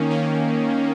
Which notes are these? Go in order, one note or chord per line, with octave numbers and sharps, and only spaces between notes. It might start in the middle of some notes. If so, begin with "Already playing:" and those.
Already playing: D#3 A#3 C#4
D#3 A#3 C#4